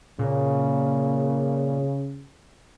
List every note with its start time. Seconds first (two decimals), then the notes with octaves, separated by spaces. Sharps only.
0.19 A#2 C#3